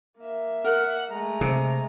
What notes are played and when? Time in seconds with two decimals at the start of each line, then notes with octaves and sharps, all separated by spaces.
0.18 A#3 E5
0.64 A#4 F#5
1.09 G#3 A3 A#5
1.41 C3